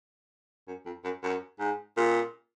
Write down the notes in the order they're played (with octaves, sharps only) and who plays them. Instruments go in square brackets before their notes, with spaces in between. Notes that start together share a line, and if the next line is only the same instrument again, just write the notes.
[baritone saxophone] F#2
F2
F#2
F#2
G#2
A#2